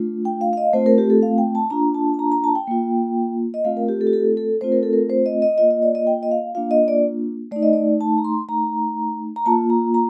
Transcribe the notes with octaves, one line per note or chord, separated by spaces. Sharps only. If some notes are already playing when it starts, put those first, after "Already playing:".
Already playing: A3 D4 F4
G5
F5
F5
D#5
A3 C4 F4 C5
A#4
G4
A4
F5
G5
A5
A#3 D4 F4 A#5
A5
A5
A#5
A#5
A5
G5
A#3 F4
D#5
A3 C4 F4 F5
A#4
G4
A4
G4
A4
A4
A3 C4 F4 C5
A#4
A4
A#4
C5
D#5
D#5
A#3 F4 D#5
D#5
D5
D#5
G5
D#5
F5
A#3 D4 F4 F5
D#5
D5
A3 D#4 D5
D#5
D5
A5
A#5
C6
A3 D#4 A#5
A#5
A#3 F4 A5
A#5
A#5